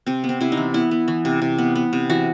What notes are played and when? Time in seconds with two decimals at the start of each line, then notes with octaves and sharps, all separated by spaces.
0.06 C3 C4
0.24 B3
0.29 C4
0.41 C3 E4
0.52 D#4
0.57 E3
0.74 B3 E4
0.91 B3
1.08 E3
1.25 C3
1.42 C3
1.58 B3
1.75 B3
1.93 C3
2.09 E3 F#4